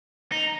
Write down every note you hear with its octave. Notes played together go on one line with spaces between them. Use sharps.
D#4